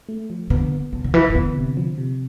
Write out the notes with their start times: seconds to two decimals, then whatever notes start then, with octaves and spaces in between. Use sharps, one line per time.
0.09 A3
0.30 F3
0.50 D3 B3
0.72 B3
0.93 C2 D3
1.04 D3
1.14 E3 F3
1.30 E3
1.35 D3 B3
1.56 C3
1.77 F3
1.98 C3